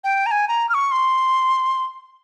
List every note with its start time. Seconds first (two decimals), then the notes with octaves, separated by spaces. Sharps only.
0.04 G5
0.26 A#5
0.31 G#5
0.48 A#5
0.69 F6
0.74 C#6
0.91 C6